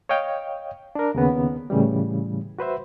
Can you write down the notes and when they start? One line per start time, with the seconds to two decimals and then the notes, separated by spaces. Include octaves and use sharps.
0.09 C#5 D#5 F5 G5
0.95 D4 A#4
1.15 D#2 C#3 B3
1.70 A2 C#3 E3 G3
2.59 F#4 B4 C5 E5